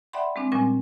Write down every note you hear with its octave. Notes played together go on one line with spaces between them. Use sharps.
D5 E5 F#5 G5 B5 C6
G#3 C4 D4
A#2 F3 G3 C4 C#4 G#5